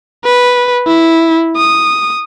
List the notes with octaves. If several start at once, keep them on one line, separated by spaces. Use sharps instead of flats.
B4
E4
D#6